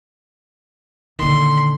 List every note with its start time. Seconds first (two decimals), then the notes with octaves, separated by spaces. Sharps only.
1.19 A#2 D3 D#3 C6